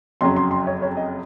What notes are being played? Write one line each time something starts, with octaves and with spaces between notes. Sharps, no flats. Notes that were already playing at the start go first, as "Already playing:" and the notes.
F#1 F2 C#3 F#3 C6
C6
C6
C#5
C#5
D#5